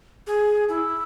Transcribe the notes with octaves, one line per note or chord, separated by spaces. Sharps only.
G#4
E4